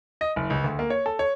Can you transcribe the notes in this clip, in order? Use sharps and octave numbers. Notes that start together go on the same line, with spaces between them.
D#5
F#1
C#2
D2
A#3
C#5
A4
C#5